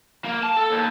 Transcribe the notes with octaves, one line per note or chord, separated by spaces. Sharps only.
A#3
A5
A4
D#2